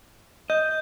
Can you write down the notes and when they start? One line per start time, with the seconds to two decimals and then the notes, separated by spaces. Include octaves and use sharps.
0.50 D#5 G6